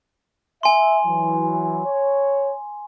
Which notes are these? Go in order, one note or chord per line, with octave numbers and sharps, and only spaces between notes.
E5 G#5 C6
E3 F#3
C#5